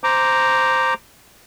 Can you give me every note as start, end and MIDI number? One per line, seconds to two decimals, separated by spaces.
0.04 0.94 72
0.04 0.94 82
0.04 0.94 86